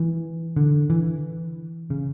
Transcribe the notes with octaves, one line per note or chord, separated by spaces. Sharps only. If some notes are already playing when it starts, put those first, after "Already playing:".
Already playing: E3
D3
E3
C#3